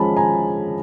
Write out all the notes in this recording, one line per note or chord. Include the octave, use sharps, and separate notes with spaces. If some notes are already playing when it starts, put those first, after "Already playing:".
Already playing: F3 G#3 C#4 A5 B5
G#5 A#5